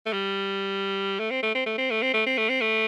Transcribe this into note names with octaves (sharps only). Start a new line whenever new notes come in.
A3
G3
A3
C4
A3
C4
A3
C4
A3
C4
A3
C4
A3
C4
A3